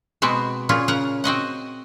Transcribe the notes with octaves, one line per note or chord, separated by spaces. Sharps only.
B2 G#3 B3 C4 F#4
A#2 C#4 F4 G#4
C#3 A#4 F#5 A#5
C4 F#4 D#5 F#5